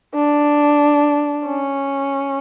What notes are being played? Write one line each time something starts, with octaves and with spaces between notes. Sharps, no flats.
D4
C#4